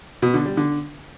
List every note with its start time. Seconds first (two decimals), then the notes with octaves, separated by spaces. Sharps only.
0.22 B2
0.34 D3
0.46 G3
0.57 D3